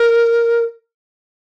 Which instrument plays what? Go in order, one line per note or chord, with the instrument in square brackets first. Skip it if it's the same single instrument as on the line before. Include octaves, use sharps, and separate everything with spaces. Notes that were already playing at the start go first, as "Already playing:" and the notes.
Already playing: [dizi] A#4